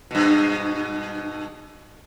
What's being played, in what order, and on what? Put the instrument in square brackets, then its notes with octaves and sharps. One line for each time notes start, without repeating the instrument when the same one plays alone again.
[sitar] G2 B2